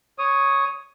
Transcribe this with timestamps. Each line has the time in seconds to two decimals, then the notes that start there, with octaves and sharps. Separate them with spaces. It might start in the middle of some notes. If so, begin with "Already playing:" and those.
0.18 C#5 D#6